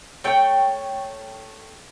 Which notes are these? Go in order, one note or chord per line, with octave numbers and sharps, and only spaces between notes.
A3 C#5 G5